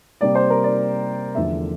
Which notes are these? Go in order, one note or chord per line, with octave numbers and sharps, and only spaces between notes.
C3 G3 A#3 D5
C5
A#4
D5
E2 D3 F3 A3 E5